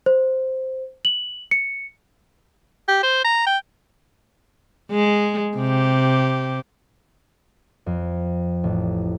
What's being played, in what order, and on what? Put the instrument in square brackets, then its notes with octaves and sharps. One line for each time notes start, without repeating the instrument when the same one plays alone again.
[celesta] C5
F#7
C#7
[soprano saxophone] G4
C5
A#5
G5
[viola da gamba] G#3
C3 G4
[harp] F2
A1